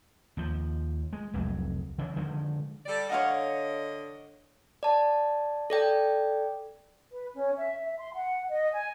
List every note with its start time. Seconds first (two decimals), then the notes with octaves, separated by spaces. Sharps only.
0.37 D#2 F3
1.13 G#3
1.34 F1 C2 F2 F#3
1.98 C#3 E3
2.16 D3 D#3 F3 G#3
2.86 G3 A4 D5
3.10 D3 C#5 D#5 F5 F#5
4.83 D5 A5
5.70 A4 D5 G5
7.11 B4
7.35 C#4
7.58 E5
7.82 E5
7.98 C6
8.13 F#5
8.49 D#5
8.73 G#5